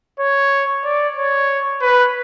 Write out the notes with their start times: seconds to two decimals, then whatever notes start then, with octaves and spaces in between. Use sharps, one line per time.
0.20 C#5
0.85 D5
1.17 C#5
1.82 B4